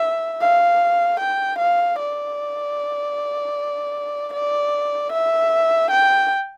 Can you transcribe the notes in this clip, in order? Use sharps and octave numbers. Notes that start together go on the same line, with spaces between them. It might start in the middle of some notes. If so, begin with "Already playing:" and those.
Already playing: E5
F5
G5
F5
D5
D5
E5
G5